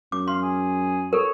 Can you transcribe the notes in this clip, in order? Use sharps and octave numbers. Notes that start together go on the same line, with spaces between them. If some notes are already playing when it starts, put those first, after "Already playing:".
F#2 D6
F5 C6
G#4
A4 A#4 C#5